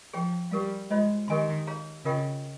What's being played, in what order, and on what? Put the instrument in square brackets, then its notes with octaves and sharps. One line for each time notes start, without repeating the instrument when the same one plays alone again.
[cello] F3 [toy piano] G#4 C#5 G5 C#6
[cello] G3 [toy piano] G4 A#4 F5
[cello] G#3 [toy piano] F4 C5 D#5
[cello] D#3 [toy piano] G4 A#4 D#5 G#5 C6
[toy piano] G#4 C#5 F5 A#5
[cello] C#3 [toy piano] F4 A#4 D#5 G5 C#6